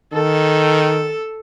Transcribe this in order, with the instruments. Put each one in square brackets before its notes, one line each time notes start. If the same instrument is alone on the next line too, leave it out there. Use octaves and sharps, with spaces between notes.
[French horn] D#3 [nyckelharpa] A4